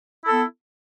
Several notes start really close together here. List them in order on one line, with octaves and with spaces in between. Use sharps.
E4 A4 B3